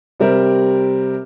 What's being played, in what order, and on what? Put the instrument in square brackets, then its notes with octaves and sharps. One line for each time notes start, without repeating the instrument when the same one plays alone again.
[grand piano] C3 G3 C4 G4 A#4